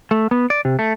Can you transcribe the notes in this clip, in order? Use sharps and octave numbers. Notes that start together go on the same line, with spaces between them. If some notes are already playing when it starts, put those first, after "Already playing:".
A3
B3
D5
C3
A3